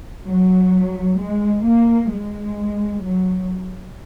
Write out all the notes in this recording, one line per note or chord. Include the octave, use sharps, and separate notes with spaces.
F#3
G#3
A#3
G#3
F#3